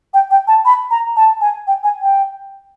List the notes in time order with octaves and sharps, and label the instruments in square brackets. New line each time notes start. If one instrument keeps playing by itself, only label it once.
[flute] G5
G5
A5
B5
A#5
A5
G#5
G5
G#5
G5